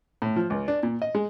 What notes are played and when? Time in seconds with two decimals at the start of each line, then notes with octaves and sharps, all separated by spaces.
0.22 A2
0.36 F3
0.50 C#2
0.68 D4
0.83 A#2
1.02 D#5
1.15 G#3